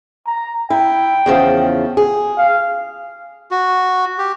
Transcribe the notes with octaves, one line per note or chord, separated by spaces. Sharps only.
A#5
E4 G5
E2 C#3 F3
G#4
F5
F#4
G4